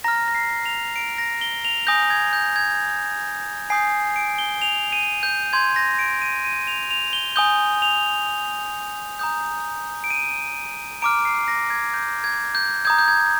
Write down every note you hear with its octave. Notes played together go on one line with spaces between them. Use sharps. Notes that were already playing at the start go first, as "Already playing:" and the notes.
A#5 F6 A#6
A#6
C7
F7
D7
A#6
G7
F7
G#5 D#6 G6 A#6
G#6
G6
G#6
G#5 D#6 G6 C7
D7
G7
F7
D#7
G6
C6 G6 G#6
A#6
D7
D#7
D#7
F7
F7
G7
G#5 D#6 G6 G7
F7
A#5 D#6 G6
D7
D#7
A#5 D6 F6 D7
C7
A#6
G#6
G6
G#6
G6
A#5 D#6 G6 G#6
G6
G#6